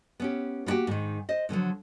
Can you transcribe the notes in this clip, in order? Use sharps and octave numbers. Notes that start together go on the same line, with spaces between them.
B3 C#4 G4
A#3 B3 E4 F#4 G4
G#2 D#3
C5 D#5
A2 D3 F3 F#3